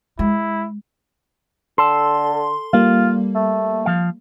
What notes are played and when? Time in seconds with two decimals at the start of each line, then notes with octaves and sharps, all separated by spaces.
0.19 G#3 E4
1.78 D3 A4 C6
2.73 G3 A#3 F4
3.35 A3
3.86 F3 F5